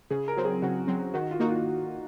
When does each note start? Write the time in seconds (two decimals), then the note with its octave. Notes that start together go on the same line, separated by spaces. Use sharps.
0.10 C#3 G#4
0.28 A#4
0.37 F#3 C4
0.45 G#4
0.62 C#3 F#4
0.87 F#3 C4
1.14 D#3 F#4
1.31 F4
1.40 A#3 D#4 F#4
1.48 F4